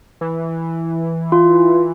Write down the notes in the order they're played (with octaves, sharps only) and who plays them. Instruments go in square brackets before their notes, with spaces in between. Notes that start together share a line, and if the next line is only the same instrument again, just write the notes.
[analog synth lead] E3
[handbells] F4